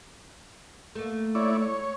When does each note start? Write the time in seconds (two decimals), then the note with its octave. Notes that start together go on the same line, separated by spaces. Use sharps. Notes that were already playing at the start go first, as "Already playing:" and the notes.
0.95 A3 A#3
1.35 E4 C#5 D5
1.62 C#5